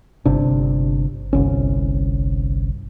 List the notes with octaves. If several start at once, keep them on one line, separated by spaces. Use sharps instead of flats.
G1 C3 D4
G1 C2 C#4